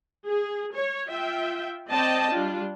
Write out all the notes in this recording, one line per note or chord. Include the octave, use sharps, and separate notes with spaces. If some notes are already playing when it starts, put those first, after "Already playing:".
G#4
C#5
F4 E5 G5
C4 C5 D5 D#5 G5 A5
G3 D4 F4